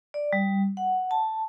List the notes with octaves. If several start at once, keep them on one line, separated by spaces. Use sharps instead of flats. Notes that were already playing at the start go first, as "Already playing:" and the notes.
D5
G3
F#5
A5